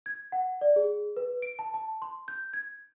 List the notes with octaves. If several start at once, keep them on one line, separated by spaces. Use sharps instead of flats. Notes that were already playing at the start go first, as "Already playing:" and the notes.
G#6
F#5
D5
G#4
B4
D7
A5
A5
C6
G6
G#6